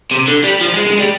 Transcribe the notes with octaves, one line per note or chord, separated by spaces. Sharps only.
C3
D3
G3
F3
G#3
G#3
G3